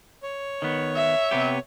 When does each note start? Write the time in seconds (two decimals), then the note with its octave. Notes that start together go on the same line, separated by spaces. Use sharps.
0.23 C#5
0.62 D#3 B3
0.96 E5
1.31 C3 B3 G4